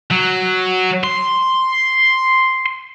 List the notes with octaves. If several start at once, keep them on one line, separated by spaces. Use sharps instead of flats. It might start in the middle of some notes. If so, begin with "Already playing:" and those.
F#3
C6